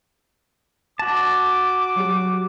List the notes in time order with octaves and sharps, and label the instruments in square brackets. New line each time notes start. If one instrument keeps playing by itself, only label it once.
[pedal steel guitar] F#4 A5 [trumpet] D6
[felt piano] F#3 G4